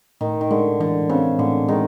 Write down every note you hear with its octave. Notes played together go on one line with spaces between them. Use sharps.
A2 D#3
D#3
D3 G#3
D3 E3
C#3 C4
A2 D3
D#3 G#3